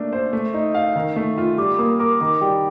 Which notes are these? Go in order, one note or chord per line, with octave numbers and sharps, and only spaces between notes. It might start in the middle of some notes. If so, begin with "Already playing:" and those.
Already playing: A3 A#3 D4
C5
A3
D#4
F5
D#3
A3
F4
G3 D6
A#3 D#6
A#4 D6
D#3 D6
G3 G5